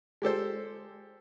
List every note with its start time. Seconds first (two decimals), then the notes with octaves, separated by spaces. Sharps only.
0.22 G#3 G4 A4 C5